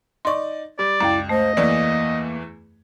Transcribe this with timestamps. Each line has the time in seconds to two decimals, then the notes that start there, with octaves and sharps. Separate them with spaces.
0.25 D#4 D5 C6 C#6
0.79 G3 D5
1.01 C#2 F#2 E4 G5
1.29 A3 C5 D#5
1.57 E2 E3 A3 A#3 D5